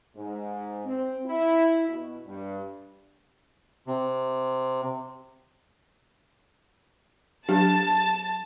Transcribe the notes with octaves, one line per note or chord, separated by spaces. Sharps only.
G#2
C4
E4
B2
G2
C3
F#3 D4 G4 A5